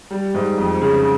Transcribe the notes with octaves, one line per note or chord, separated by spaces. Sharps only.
G3
G#2
F2
C#3